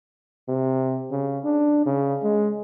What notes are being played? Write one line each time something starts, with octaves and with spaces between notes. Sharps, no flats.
C3
C#3
D4
C#3
G#3